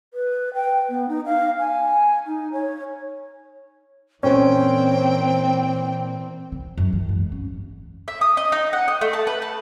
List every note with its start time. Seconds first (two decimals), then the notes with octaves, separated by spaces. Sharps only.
0.14 B4
0.54 G5
0.90 B3
1.09 D#4
1.26 F5
1.59 G#5
2.26 D#4
2.52 C#5
4.23 A#2 E3 C4 C#4 C5 G5
6.52 D3
6.77 F#2
6.92 E3
7.09 G#2
7.32 C#4
8.08 E5
8.21 D#6
8.37 D#5
8.52 D#4
8.73 F#5
8.88 D#5
9.01 A3
9.13 A5
9.27 B4
9.42 A5